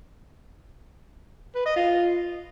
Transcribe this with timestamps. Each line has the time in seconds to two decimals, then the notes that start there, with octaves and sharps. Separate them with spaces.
1.55 B4
1.66 D#5
1.76 F4